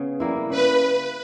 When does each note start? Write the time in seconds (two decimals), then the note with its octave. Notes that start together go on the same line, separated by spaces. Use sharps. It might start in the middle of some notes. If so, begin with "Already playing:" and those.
Already playing: C#3 B3 G#4
0.20 G3 A#3 E4
0.50 C#3 B4